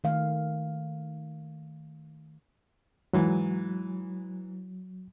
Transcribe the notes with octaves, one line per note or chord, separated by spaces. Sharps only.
D#3 A3 F5
G#2 E3 F#3